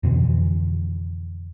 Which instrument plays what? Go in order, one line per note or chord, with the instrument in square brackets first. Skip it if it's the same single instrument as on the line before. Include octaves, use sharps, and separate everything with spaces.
[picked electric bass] F2 B2 D3 E3